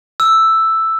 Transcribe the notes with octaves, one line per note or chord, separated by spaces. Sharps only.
E6